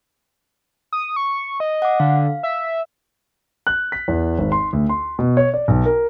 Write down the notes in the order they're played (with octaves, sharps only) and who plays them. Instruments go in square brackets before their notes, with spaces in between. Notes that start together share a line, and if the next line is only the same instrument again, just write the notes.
[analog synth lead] D#6
C#6
D#5
[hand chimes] F#5 D6
[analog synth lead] D3 [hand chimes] F5
[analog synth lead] E5
[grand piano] F#6
B6
E2
G#1
C6
D2
C6
B2
C#5
D5
B1
A#4